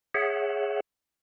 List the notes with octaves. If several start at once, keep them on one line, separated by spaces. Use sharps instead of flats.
G#4 C#5 E5 F#5